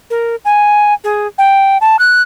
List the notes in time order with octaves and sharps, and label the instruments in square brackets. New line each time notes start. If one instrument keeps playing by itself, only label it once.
[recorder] A#4
G#5
G#4
G5
A5
F#6